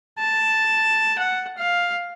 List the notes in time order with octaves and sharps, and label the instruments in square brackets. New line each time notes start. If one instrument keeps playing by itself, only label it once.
[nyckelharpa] A5
F#5
F5